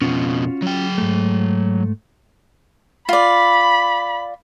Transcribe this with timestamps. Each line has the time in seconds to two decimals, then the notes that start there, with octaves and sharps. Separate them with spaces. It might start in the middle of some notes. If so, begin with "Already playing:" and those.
0.02 F2 B2 C#4 F4 F#4
0.62 F#3 G5
0.98 G#2 A3
3.09 F4 D5 B5